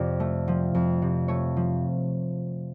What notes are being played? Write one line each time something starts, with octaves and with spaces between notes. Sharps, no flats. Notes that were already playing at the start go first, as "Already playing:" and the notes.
Already playing: F2 C3 D5
A3
F3
F2
C3
A3 C#5
F3